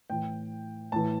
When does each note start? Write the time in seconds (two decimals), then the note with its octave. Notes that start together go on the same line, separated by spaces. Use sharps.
0.10 A2 E3 G5
0.92 A2 E3 A5